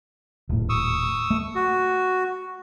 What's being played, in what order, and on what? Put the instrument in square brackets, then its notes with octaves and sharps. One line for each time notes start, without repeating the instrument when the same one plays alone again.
[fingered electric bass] D#1 A2
[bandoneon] C#6 D#6 E6
[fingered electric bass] A3
[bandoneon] F#4